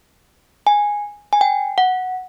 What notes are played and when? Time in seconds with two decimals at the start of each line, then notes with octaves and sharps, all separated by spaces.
0.67 G#5
1.33 G#5
1.41 G5
1.78 F#5